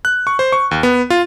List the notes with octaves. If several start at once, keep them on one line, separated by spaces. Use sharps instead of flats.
F#6
C#6
C5
C#6
D#2
B3
F4